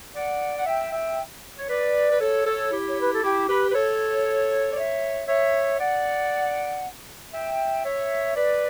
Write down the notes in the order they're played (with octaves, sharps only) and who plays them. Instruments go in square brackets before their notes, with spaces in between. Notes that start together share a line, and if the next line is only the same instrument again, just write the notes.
[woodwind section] D5 F#5
F#5
E5 G5
E5 G5
C#5
B4 D5
B4
A4 C#5
A4 C#5
E4 G4
C#5
B4
A4
E4 G4
G4 B4
B4
A4 C#5
D5
C#5 E5
C#5 E5
D5 F#5
E5 G5
C#5 E5
B4 D5